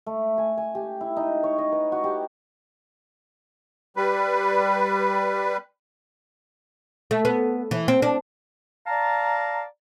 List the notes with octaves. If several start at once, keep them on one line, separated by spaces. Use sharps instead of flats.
A3
G#5
G#5
G4
E4
D#4
C#5
D#5
B4
F#4
G4
G3 B4
A3
B3
E3
C4
D4
D5 F5 A5 A#5